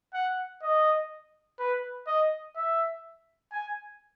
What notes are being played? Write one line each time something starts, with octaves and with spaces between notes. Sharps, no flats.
F#5
D#5
B4
D#5
E5
G#5